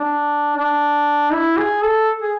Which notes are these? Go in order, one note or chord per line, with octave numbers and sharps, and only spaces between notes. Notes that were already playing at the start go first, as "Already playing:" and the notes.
Already playing: D4
D4
E4
G#4
A4
G#4